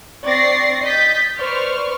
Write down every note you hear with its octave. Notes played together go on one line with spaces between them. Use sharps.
C4 D5 C#6 A6 A#6 C7
D#5 G6 A6 B6
B4 C5 D5 C#6 F6